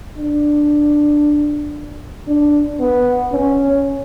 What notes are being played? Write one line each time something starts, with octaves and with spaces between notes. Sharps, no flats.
D4
D4
B3
C#4